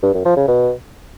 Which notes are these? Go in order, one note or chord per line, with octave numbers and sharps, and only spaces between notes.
G2
F#2
F3
C#3
B2